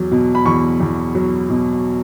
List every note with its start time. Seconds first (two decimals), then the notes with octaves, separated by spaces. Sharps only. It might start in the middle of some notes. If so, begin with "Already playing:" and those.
Already playing: E2 F#3
0.11 B2
0.35 B5
0.45 E2 C#6
0.80 E2
1.15 F#3
1.50 B2